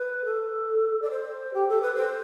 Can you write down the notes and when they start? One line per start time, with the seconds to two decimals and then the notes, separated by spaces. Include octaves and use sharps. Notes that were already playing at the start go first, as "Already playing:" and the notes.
Already playing: B4
0.25 A4
1.02 D5
1.11 C5
1.54 G4
1.69 A4
1.82 B4
1.95 C5